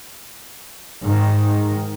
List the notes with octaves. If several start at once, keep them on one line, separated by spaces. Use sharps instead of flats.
G#2 D#3